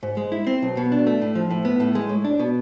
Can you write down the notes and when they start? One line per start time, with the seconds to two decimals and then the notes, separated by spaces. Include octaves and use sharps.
0.03 G#2
0.17 G#3
0.32 E4
0.47 C4
0.62 B1
0.77 B2
0.92 D4
1.07 A3
1.22 A2
1.35 F3
1.51 A2
1.65 B3
1.80 A2
1.95 G#3
2.09 A2
2.25 D4
2.39 B2